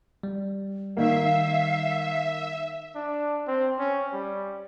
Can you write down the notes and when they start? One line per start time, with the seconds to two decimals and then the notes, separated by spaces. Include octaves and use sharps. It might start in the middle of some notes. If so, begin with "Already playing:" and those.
0.23 G3
0.97 D#3 A#3 E5 F5
2.95 D4
3.48 C4
3.79 C#4
4.13 G3